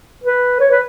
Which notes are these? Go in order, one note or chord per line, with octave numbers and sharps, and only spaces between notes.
B4
C#5
B4